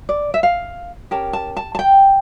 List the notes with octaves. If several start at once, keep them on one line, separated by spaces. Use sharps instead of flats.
D5
E5
F5
C#4 G4 A#4 A5
A5
A5
A5
G5